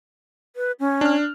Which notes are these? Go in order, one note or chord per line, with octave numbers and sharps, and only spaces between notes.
B4
C#4
D4 F6